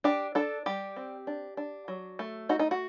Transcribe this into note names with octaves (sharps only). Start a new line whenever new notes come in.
D4 G4
D4 A4
G3 G4
C4
D4
D4
F#3
A3
D#4 F#4
D#4
F#4